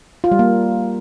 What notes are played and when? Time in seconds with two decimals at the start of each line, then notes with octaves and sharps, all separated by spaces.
0.24 F4
0.32 G3
0.39 A#3